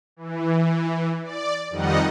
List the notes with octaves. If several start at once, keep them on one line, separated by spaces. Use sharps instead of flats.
E3
D5
F2 D#3 G3 D#4 D#5 F#5